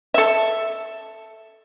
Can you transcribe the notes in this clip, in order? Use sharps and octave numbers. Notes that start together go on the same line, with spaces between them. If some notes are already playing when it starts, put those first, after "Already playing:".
A4 E5